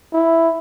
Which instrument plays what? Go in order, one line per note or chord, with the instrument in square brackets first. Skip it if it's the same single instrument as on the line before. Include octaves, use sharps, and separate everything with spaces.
[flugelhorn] E4